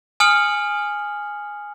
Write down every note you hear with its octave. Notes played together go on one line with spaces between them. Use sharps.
G#5 D#6 F6 C#7 F#7